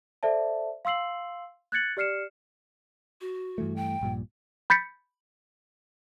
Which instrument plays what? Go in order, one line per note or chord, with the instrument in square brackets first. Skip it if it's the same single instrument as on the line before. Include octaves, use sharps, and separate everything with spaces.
[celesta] A4 C5 D5 E5 A5
F5 C6 E6 C7 F#7
F#6 G#6 A6 C#7 F#7
G4 D5 F6 C7 C#7 E7
[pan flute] F#4
[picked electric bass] G2 E3 A3
[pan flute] G5
[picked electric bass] A#1 G2 A#2
[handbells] B5 G6 A6 B6 C#7